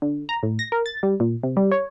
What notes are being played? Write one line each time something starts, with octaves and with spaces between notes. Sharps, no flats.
D3
A#5
A2
A#6
A#4
A6
G3
A#2
C3
G3
C#5